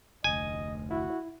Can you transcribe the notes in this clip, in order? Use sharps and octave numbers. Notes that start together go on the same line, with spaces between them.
F1 D2 D#5 G#5
E4 F#4